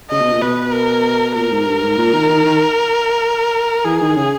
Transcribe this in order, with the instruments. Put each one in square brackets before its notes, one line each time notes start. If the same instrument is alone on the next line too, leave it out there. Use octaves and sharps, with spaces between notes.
[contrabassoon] C#3 [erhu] D#5
[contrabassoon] B2
A#2
[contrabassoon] B2 [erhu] B4
[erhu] A#4
[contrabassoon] A#2 [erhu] A#4
[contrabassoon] G#2
G2
G#2
A#2
D#3
D#3
D#3
[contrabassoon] E3 [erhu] G#4
[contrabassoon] D#3
C#3